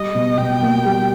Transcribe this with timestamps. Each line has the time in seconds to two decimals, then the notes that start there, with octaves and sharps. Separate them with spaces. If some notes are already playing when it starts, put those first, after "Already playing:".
Already playing: G3 D#5
0.15 B2
0.38 B2 G5
0.62 A#3
0.85 G3